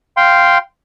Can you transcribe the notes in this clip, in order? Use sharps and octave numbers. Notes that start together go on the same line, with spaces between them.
F5 G5 C6